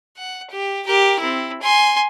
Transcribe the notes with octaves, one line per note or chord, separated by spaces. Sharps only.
F#5
G4
G4 A#4
C4 E4
G#5 C6